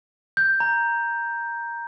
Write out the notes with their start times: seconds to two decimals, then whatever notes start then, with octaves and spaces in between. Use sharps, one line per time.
0.37 G6
0.60 A#5